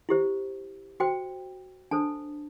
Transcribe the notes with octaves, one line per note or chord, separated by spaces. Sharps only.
E4 G4 C5
F#4 C5 G5
D4 A4 C5 A5